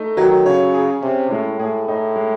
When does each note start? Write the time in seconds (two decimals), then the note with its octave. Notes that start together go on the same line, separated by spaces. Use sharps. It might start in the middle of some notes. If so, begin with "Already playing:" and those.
Already playing: A3 D#4
0.17 D#3 F#3
0.45 C#3 C#5
0.74 G#4
1.02 C3 C#4
1.30 A2 G#3
1.59 A2 G#4
1.87 A2 D#4
2.16 G#3